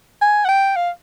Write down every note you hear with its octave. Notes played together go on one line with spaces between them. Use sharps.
G#5
F#5
G5
F5